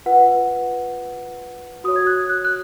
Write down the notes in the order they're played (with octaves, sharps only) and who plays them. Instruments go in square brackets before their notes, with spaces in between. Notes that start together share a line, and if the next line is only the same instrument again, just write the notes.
[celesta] F4 B4 F#5
F#4 C#5 D#6
G#6
F#6
F#6
F#6